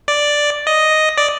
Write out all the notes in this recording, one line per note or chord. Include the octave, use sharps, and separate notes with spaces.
D5
D#5
D5